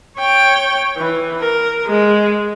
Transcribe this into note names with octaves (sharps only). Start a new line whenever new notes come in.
C#5 G5
E3
A#4
G#3